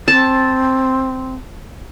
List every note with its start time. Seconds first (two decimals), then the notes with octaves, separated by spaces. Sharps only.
0.08 C4 A5